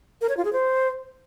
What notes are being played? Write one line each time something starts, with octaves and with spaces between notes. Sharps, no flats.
A#4
C#5
F4
G#4
C5